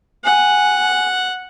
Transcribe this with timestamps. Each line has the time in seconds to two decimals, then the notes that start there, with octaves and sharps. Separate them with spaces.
0.24 F#5 G#5